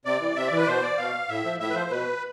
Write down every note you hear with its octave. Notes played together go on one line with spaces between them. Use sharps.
C3 D5
E3
C3 E5
D5
E3
B4
D5
B2 C5
D5
B2 F5
A2 E5
F3
A2 E5
B4
F3 C5
B2 B4